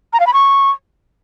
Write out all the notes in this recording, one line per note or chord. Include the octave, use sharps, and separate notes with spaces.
A#5
F5
B5
C#6